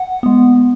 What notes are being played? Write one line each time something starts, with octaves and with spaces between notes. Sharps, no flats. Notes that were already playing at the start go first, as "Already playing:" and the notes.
Already playing: F#5
G#3 B3